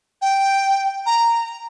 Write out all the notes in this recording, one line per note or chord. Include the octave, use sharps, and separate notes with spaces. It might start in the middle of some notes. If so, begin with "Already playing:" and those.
G5
A#5